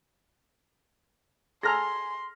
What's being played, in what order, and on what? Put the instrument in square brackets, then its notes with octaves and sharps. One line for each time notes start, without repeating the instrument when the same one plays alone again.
[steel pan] G#4 A4 A#5 [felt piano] G#5 F6 A#6 [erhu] C6